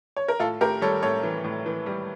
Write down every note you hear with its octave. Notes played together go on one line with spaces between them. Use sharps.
C#5
A#4
A2 F4 A4
A2 G4 A#4
G3 A4 C#5
A2 A4 C#5
E3
A2
E3
G3